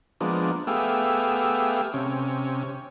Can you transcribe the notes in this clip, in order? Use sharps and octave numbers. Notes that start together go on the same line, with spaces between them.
F3 G#3 A#3 B3 D4
A3 B3 G4 G#4 E5 F5
C3 C#4